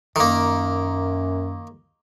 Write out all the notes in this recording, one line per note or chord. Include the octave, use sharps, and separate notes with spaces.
F#2 D#3 A#3